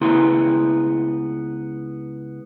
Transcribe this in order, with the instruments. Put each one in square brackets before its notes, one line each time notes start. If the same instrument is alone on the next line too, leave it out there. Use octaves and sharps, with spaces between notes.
[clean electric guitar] C#2 B3 E4 G#4 A#5 C6